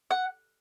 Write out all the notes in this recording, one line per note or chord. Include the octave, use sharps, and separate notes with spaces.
F#5